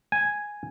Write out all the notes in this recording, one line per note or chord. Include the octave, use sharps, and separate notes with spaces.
G#5